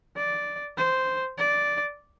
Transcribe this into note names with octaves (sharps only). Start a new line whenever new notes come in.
D5
C5
D5